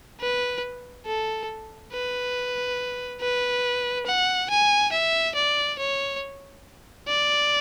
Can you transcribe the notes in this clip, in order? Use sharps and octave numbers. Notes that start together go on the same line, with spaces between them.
B4
A4
B4
B4
F#5
G#5
E5
D5
C#5
D5